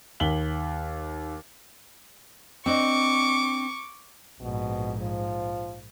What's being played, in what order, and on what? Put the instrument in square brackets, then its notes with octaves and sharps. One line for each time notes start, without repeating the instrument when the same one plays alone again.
[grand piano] D#2 B6 F#7 G7
[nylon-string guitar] C4 D4 D#5 [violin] C#6 [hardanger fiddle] D6
[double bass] A#1 G#2 [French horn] B2
[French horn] F3